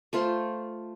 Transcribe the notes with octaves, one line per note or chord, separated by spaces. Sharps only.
A3 F4 C5